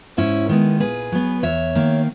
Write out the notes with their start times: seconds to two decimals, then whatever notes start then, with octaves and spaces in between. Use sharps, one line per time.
0.17 G#2 C#4 E4
0.49 D#3 G#3 B3
0.80 A#2 G#4 B4
1.12 F#3 B3
1.43 E2 C#5 E5
1.75 D#3 A#3